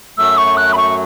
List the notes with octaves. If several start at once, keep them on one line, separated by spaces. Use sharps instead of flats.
F#2 F#3 A3 E6
C#6
F#6
B5
C#6